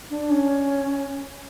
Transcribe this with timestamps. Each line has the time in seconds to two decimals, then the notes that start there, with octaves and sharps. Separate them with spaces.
0.10 D4
0.30 C#4